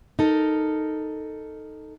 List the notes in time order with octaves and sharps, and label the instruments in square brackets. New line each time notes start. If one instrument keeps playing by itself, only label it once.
[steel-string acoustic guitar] D#4 A4 A#4